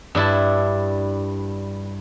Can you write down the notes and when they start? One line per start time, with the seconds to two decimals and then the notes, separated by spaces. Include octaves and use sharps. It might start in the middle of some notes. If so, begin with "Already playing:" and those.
0.15 G2 D4 E4 A5